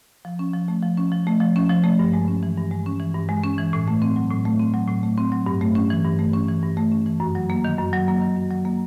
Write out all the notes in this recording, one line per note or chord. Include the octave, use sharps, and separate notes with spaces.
F3
C#4
F3
A3
F3
C#4
F3
A3
F3
C#4
F3
A3
G2
G#3
C#4
E3
G2
G#3
C#4
E3
G2
G#3
C#4
E3
A2
A3
C4
F#3
A2
A3
C4
F#3
A2
A3
C4
F#3
G2
A3
C#4
E3
G2
A3
C#4
E3
G2
A3
C#4
E3
F#2
F#3
A#3
D#3
F#2
F#3
A#3
D#3
F#2
F#3
A#3